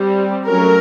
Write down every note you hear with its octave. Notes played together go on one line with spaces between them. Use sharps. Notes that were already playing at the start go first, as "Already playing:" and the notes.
Already playing: G3 C4
F#3 A3 C#4 A#4